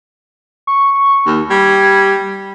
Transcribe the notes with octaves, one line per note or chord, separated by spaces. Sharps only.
C#6
D#2
G3 G#6